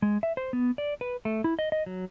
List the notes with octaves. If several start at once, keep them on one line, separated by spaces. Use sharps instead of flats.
G#3
E5
C5
B3
D5
B4
A3
E4
D#5
D#5
F#3